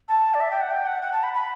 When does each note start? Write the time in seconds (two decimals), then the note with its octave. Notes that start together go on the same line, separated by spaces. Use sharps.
0.08 A5
0.34 D5
0.40 E5
0.51 G5
0.61 F#5
0.70 G5
0.86 F#5
1.02 F#5
1.12 A5
1.23 B5
1.34 B5